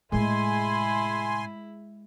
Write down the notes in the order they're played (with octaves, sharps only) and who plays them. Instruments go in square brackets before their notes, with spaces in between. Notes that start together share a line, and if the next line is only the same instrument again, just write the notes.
[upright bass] A2 C3 [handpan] G#3 [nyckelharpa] E4 B5 [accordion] G#5 C6